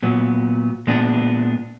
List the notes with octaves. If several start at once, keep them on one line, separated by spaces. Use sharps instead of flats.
A#2 F#3 B3
A#2 G#3 B3 D4